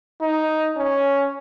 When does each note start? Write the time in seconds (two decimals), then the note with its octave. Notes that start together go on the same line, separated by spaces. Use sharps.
0.21 D#4
0.77 C#4